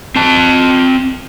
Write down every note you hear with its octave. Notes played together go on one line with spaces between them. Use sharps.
C4 A5